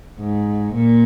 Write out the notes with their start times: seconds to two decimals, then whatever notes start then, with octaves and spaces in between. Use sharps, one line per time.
0.19 G#2
0.74 A#2